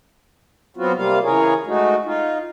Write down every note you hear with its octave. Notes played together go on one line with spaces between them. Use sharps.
F#3 B3 C4 F4 F#4
C3 G3 A#3 F4 F5
C#3 E3 G#4 A#4 C#5
G#3 A3 D#4 F#4
D#4 F4